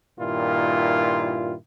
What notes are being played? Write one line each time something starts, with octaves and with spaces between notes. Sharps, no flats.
G2 A#2 D#3 E4 F4